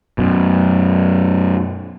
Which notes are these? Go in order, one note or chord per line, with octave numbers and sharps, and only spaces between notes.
F#2 B2